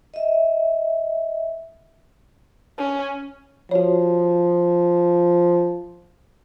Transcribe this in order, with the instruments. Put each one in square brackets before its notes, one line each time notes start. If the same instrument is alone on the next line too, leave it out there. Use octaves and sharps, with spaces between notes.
[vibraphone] D#5 E5
[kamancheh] C#4
[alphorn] F3 [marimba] F#4 C#5